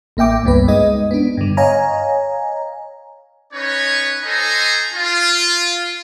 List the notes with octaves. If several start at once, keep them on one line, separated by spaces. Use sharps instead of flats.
A1 A#3 E5 G5 D6
C#2 G2 B3 B4
G#3 D#4 D#5
B3 D4
G2 D3
C#5 D#5 F5 G#5 A#5
C#4 D#4 B4 C#5
D#4 A4 C5 D#5 G#5 A#5
F4